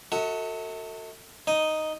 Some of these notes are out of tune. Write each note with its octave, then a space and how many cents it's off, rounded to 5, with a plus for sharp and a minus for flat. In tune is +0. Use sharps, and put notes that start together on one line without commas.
F#4 +0 A4 +35 E5 -45
D#4 +0 D#5 +0